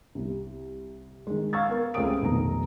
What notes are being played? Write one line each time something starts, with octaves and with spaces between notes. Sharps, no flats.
C2
D#3 G#3
F5 C#6 E6 G#6 A6
B3 A#4
C#2 A3 C4 F5 D#6 D7
F1 B1 D#3 A#5